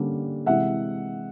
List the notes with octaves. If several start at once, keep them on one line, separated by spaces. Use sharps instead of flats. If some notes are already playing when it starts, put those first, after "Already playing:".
Already playing: D3 G3 A#3 C#4
C3 E3 G#3 E5 F#5